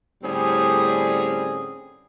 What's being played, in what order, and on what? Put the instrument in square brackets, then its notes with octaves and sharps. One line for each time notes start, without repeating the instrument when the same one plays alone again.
[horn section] A2 D3 G3 C4 C#4 G#4